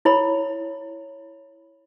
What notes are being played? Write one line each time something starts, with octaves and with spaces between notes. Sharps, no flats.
E4 C#5 B5